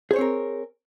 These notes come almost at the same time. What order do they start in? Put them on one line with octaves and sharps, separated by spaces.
G#4 C5 C#5 C4 A#4